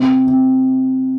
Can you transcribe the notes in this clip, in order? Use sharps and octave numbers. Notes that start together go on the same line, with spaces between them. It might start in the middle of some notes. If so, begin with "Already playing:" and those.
Already playing: C3
C3